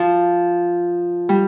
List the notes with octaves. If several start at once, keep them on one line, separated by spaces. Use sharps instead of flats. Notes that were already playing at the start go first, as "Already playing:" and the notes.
Already playing: F3
G3